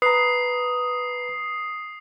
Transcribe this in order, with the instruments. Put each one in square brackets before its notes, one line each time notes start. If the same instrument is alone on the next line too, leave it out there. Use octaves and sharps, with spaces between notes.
[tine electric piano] B4 A#5 [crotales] D#6 C7